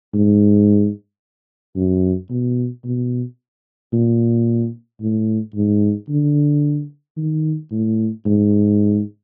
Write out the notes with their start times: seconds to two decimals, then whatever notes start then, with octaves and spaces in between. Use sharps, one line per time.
0.13 G#2
1.76 F#2
2.29 B2
2.84 B2
3.92 A#2
5.01 A2
5.55 G#2
6.09 D3
7.17 D#3
7.71 A2
8.25 G#2